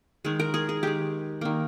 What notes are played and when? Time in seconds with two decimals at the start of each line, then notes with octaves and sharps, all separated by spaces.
0.25 D#3 G#3 G#4
0.40 A#4
0.54 G#4
0.69 G#4
0.83 D#3 G#3 G4
1.41 D#3 A#3